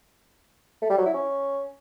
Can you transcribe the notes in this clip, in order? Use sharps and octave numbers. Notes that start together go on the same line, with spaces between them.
A3
G3
F#3
E4
C#4